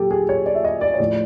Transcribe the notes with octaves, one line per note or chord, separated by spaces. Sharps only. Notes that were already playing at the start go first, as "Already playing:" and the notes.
Already playing: A#2 F#3 G4 A4
G#4
C#5
D5
E5
D#5
D5
C#5
A2 F3 D5